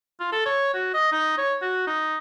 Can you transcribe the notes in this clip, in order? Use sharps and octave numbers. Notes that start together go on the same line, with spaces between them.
F4
A4
C#5
F#4
D#5
D#4
C#5
F#4
D#4